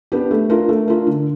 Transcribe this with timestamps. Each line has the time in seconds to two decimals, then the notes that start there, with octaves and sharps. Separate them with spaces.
0.12 B3 D4 G4
0.31 A3
0.50 D4 F4 A#4
0.69 A3
0.88 D4 F4 A#4
1.07 D3